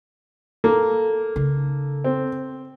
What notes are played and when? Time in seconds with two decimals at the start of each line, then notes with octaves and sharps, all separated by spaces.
0.64 A#3 A4
1.36 C#3 D#4
2.04 C4